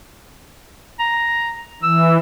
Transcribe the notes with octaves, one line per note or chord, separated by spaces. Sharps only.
A#5
E3 E6